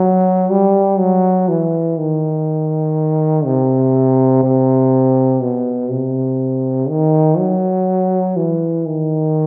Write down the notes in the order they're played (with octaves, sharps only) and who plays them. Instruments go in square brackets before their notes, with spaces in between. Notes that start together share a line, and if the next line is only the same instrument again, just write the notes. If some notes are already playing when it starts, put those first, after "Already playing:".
Already playing: [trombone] F#3
G3
F#3
E3
D#3
C3
C3
B2
C3
D#3
F#3
E3
D#3